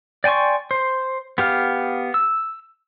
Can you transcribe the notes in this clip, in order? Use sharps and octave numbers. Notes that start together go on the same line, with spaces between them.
D5 G5 G#5 C6 C#6
C5
B3 G4 F5
E6